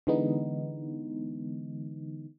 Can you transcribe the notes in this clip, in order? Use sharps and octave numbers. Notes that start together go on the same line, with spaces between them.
D3 E3 G#3 B3 D#4